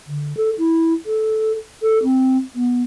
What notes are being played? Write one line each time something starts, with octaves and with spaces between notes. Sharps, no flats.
D3
A4
E4
A4
A4
C4
B3